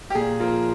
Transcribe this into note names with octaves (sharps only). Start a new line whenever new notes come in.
G4
A#2 G#4
F3 A#3 F4